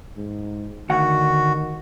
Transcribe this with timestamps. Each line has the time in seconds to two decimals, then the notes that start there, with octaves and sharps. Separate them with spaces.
0.17 G#2
0.90 D2 D#3 F#4 F#5